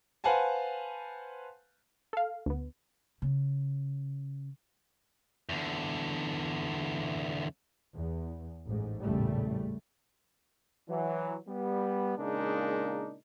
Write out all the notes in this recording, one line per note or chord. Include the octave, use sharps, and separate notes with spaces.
B4 C5 F5 F#5 G#5 A5
A4 F5
D2 B3
C#3
E2 D3
E2
A1 G#2
A1 E2 A#2 C#3 G3 A3
E3 F#3
G3 B3
A#2 C#3 G#3 D4 D#4 A#4